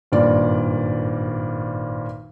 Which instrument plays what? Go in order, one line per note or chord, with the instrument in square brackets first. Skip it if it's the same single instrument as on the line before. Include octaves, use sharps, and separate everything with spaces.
[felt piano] G#1 G2 A#2 D5